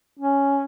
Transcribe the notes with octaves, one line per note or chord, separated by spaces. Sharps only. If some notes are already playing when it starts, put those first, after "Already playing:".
C#4